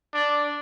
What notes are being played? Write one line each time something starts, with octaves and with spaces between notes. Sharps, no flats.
D4